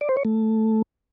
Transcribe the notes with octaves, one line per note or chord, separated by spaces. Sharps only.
D5
C5
C#5
A3